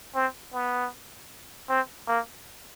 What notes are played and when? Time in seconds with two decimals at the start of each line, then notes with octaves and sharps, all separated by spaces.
0.15 C4
0.53 B3
1.69 C4
2.08 A#3